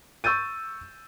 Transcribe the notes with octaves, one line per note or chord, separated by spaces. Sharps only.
C#6 E6 G6 A6 D#7